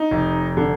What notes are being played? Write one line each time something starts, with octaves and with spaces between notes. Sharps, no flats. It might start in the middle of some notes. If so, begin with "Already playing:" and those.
Already playing: D#4
F1
D3